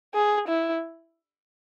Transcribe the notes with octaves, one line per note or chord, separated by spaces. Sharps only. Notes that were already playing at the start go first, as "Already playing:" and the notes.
G#4
E4